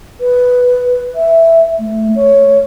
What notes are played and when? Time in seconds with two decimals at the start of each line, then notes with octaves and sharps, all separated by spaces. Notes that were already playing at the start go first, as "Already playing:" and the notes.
0.21 B4
1.16 E5
1.80 A3
2.16 C#5